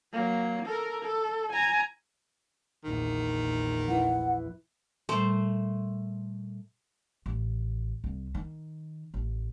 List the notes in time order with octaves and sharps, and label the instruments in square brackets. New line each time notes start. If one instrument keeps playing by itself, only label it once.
[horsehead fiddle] F#3 A#3
A4 A#4
A4
G#5 A#5
[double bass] A#1 E2 [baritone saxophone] D#3
[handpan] F3 E4 B4 [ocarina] F#5
[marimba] A#2 G3 [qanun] A3 C5
[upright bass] A1
C2
D#3
A1